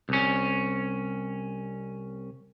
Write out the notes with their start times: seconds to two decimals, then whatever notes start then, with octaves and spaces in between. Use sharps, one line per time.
0.09 C2 C#4